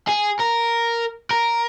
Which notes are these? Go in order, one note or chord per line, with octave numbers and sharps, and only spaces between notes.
G#4
A#4
A#4